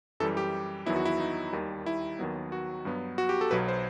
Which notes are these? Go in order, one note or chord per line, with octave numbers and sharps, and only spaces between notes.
F#2 E3 G3 A4
G4
E2 D#3 F#3 B3 E4
F#4
E4
D#4
D#2 D#3 G3
E4
D#2 D#3 F#3 B3
F#4
G2 F#3 B3
F#4
G4
A4
B1 B2 F#3 B4
C5